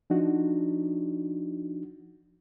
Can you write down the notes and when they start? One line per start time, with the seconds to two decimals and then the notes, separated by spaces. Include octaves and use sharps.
0.10 F3 D4 D#4 F#4